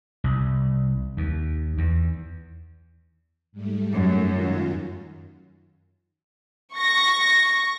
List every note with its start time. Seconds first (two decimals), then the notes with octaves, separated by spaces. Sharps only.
0.24 C2
1.17 D#2
1.78 E2
3.52 G#2 G3 A3
3.93 F#2
4.32 D#3 F4
6.75 C#6 A#6